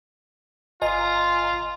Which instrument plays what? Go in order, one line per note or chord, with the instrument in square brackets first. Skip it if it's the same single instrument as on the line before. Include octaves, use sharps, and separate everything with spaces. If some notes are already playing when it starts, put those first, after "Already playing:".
[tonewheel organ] G1 A#5 [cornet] F4 [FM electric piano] D#5 G#5